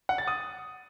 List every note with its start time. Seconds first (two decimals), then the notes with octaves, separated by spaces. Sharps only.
0.09 F#5
0.18 A6
0.28 D#6